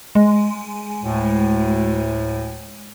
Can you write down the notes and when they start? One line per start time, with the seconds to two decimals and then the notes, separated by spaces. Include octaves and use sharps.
0.15 G#3
1.03 D2 A2